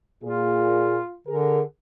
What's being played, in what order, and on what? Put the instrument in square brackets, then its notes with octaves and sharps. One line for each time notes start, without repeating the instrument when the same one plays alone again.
[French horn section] A#2 G#4 [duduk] F4
[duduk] D3 [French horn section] G#4 A#4